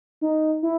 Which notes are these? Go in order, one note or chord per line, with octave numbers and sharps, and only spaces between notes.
D#4
E4